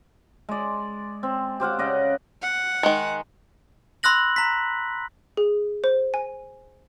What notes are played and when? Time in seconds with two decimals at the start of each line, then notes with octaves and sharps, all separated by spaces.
0.49 G#3 D5
1.23 C4
1.60 G4 C5 F5 F#5
1.79 C#3 D5 D#5 F#5
2.42 F#5
2.83 D#3 G#3
4.03 B5 C6 E6 F#6 A#6 F#7
4.36 A#5 B6
5.37 G#4
5.84 C5
6.14 G#5